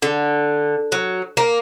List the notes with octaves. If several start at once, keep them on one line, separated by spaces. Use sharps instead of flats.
D3
F#3
A#3